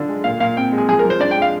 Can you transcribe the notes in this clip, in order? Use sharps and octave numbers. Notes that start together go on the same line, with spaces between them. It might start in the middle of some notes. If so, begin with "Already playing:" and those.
Already playing: D3 D4 F4
G#3
A#2 F5
A#2 F5
C4 G5
G#3
G#4
F3 G#4
A#4
F3
C5
D4 D5
G5
G#3
F5